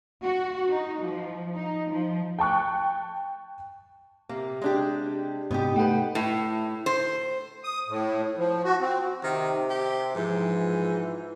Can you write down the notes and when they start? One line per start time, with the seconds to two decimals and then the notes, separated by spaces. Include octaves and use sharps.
0.24 F#4
0.71 D#4
1.03 F3
1.56 D#4
1.91 F3
2.39 G5 A5 C#6 F#6
4.29 C3 A#3
4.62 G#3 D4 G4
5.51 G#2 C3 B3 D#4 G4
5.76 A3 A4 B4 F#5 G5
6.15 A2
6.86 C5
7.64 D#6
7.88 A2
8.38 F3
8.64 F#4
8.80 C4
9.23 C3 D#3
9.70 G4
10.16 G#2 E3 F3